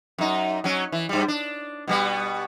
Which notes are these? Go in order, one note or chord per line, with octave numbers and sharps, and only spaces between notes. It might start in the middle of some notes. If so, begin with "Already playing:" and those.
F#2 D#4
F#3 C#4
E3
G2 G3
D4
B2 G3 B3